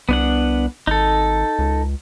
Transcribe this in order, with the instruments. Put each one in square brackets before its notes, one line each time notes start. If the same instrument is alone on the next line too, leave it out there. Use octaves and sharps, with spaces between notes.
[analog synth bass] C2 [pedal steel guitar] B3 D4 F#5
[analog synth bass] G#1 [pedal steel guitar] D#4 A4
[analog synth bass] C#2